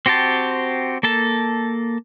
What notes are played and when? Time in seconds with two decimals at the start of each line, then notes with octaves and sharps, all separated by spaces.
0.06 C4 F#4 G4 C5 A5
1.03 A#3 A4 A5